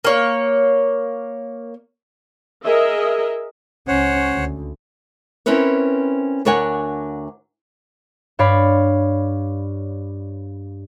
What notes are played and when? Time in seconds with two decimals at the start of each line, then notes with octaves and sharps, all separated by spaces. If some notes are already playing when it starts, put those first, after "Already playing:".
0.05 A#3 C#5
2.63 G#4 A#4 D#5 E5
3.88 C#2 C#4 C5 C#5 F#5
4.33 D2
5.46 C4 C#4 E4 A#4 B4 C#5
6.45 D2 D4 A#4 C#5 F#5 G#5
8.39 G2 C#5 D5 F5 B5